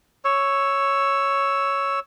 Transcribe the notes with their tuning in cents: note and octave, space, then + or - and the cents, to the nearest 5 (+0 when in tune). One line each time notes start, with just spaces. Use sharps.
C#5 +0 E6 +0